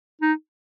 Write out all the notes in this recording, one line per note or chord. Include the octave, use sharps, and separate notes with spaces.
D#4